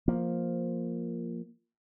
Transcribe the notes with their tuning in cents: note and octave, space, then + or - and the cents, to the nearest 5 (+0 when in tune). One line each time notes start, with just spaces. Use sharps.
F3 +0 A#3 +0